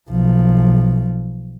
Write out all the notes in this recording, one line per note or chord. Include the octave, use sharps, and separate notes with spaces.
B1 F3